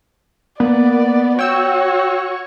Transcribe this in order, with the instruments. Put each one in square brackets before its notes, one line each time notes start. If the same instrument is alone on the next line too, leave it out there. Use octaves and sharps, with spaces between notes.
[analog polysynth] A#3 [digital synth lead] B3 [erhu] D5
[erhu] F#4 [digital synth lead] C#5 [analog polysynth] G5 E6